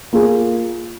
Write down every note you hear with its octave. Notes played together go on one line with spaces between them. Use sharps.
A#3 F4 G#4